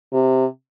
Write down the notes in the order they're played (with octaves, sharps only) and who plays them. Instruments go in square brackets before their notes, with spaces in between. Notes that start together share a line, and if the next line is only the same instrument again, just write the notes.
[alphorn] C3